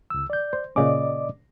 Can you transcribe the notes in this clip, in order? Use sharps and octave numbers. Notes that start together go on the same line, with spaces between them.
C#2 E6
D5 G6
C5
A#2 C#3 C#4 D5 D#5 D6